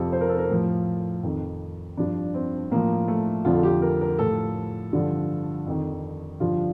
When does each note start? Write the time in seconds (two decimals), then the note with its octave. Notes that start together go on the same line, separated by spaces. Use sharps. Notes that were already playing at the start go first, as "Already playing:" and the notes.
Already playing: F2 C3 F3 A4
0.13 C5
0.21 A#4
0.29 A4
0.38 A#4
0.50 A2 F3
1.23 F2 D#3
1.97 G2 F3 D4
2.34 C4
2.71 A2 F3 A#3
3.08 A3
3.45 F2 D3 F3 F4
3.63 G4
3.82 A#4
4.01 A#4
4.19 A2 F3 A4
4.93 G2 D3 F3
5.66 F2 D#3
6.40 G2 D3 F3 F4